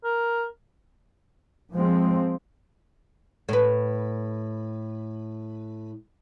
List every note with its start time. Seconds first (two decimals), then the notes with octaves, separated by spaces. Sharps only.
0.04 A#4
1.73 F3 G#3 C4
3.49 A2 B4